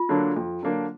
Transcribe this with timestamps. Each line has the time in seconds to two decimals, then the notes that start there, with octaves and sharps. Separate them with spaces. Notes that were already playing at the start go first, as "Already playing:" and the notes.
Already playing: F4
0.09 D3 F#3 A#3 D4
0.36 F2
0.63 D3 F#3 A#3 D4